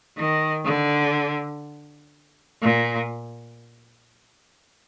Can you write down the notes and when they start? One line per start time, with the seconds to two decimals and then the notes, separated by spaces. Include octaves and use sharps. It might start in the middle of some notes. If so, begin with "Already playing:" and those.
0.17 D#3
0.65 D3
2.62 A#2